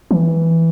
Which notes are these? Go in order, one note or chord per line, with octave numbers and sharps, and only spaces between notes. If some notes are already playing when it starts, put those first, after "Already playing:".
E3